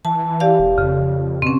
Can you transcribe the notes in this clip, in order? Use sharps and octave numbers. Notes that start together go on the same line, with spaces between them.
E3 A5
G4 D5 F5
E1
F2 C#3
B2 C4 C#4